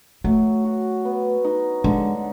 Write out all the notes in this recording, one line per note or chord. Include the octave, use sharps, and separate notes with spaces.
F#3 A3
F#4
B3
D#4
D3 G#3